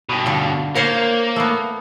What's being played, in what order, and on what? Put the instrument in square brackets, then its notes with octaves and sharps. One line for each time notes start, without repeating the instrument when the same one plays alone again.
[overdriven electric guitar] G2 B2
[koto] D3 F4
[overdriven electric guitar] A#3 [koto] F4 C5 C#5
[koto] A3 B3